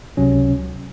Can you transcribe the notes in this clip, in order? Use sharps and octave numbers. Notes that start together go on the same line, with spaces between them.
C#2 C3 F#3 C#4